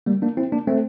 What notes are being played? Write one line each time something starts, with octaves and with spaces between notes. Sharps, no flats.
G3 A#3
A#3 D4
C4 E4
A#3 D4
A3 C4